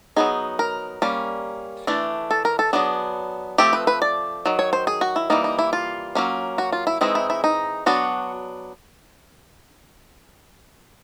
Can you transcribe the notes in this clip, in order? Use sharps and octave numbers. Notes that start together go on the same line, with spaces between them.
F#3 B3 D#4 G#4
A#4
G3 A#3 C#4
E3 A3 D4
A4
A#4
A4
F#3 B3 D4 G#4
F3 A3 C4 G4
B4
B4
D5
D#3 F#3
C#5
C5
G#4
F#4
E4
E3 G3 A#3 D#4
D#4
E4
F4
F#3 A#3 C#4
F#4
F4
E4
E3 G#3 C4 D#4 E4
E4
E4
D#4
F#3 B3 D4 F#4